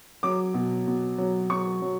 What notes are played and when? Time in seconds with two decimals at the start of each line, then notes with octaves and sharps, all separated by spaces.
0.23 F#3 D6
0.54 B2
0.87 B2
1.18 F#3
1.50 F#3 C#6
1.82 F#3